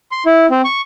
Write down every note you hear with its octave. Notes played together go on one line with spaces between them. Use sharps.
C6
E4
C4
C#6